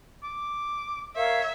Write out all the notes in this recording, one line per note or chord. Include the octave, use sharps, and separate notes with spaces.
D6
A#4 C#5 E5 F5 E6